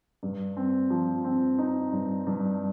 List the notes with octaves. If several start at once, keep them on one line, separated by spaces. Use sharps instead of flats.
G2
C4
F3
C4
D#4
G2
G2